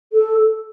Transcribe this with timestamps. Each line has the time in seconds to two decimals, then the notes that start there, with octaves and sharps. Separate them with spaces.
0.13 A4